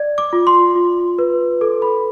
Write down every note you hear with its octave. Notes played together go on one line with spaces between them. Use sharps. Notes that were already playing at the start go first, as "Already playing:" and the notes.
Already playing: D5
D6
F4
C6
F4
B4
A4 D6
B5